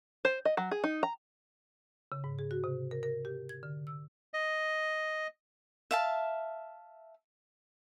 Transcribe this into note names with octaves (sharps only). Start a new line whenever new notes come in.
C5
D#5
F#3
G#4
D#4
A#5
C#3
G#2
G#4
F#4
C3
A#4
A#4
G4
G#6
D3
E6
D#5
E5 F5 A5